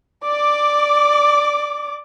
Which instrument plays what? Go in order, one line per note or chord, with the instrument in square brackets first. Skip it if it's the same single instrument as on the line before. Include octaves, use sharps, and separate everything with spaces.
[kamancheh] D5 D6